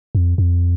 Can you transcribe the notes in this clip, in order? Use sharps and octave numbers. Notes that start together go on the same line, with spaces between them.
F2
F2